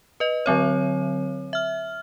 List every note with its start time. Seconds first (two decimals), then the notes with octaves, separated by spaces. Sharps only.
0.20 B4 D#5
0.46 D3 F#3 C4 C#5
1.53 E5 F6